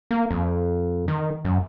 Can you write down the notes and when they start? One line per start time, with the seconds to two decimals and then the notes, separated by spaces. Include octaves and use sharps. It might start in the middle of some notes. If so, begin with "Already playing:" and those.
0.11 A#3
0.31 F2
1.08 D#3
1.45 F#2